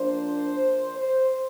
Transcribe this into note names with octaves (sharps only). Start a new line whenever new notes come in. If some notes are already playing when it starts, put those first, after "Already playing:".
Already playing: F3 A#3 D4 C5
C5